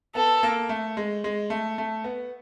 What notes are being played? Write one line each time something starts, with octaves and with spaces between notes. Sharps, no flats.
B3 A4
A#3
A3
G#3
G#3
A3
A3
B3